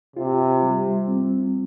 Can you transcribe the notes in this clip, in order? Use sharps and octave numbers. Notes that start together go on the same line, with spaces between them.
C3 F4
G3
C4